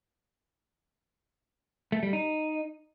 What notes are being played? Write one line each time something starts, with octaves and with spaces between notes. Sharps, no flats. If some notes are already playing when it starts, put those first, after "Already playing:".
A3
G3
D#4